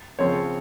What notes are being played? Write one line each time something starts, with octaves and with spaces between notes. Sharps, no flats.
C#3 F3 C4 C#5